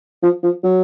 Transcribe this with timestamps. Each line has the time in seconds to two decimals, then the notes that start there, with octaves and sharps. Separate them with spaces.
0.23 F3
0.43 F3
0.64 F#3